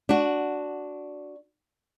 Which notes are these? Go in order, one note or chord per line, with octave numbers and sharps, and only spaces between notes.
D4 F#4